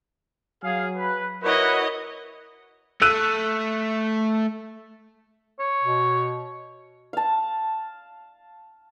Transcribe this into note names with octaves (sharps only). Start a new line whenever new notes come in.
F#3 G#4 F5
B4
E4 F#4 A#4 B4 C#5 D#5
A3 E6 F#6 D#7
C#5
B2
F5 A5